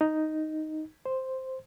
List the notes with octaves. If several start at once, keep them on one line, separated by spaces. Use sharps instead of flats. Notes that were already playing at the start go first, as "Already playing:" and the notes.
D#4
C5